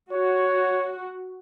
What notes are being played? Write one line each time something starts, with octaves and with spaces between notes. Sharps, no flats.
F#4 C#5